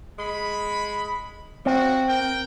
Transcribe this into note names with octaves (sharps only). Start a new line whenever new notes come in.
G#3 B5
F3 C4 F#4
A#4 G5